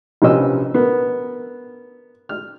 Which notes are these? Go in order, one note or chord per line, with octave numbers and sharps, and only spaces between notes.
A#1 C3 B3 C#4 D#5 E6
B3 A#4
F6